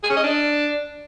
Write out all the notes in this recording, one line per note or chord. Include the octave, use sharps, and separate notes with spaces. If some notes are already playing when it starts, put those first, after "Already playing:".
G#4
C#4
D#5
D4